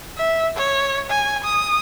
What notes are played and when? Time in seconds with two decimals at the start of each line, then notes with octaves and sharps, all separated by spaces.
0.17 E5
0.56 C#5
1.10 G#5
1.44 D#6